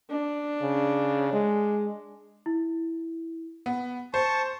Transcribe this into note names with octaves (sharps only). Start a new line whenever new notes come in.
D4
C#3
G#3
E4
B3
C5 A5 C#6